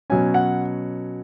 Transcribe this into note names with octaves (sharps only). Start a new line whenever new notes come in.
B2 F#3 C#4 G#5
F#5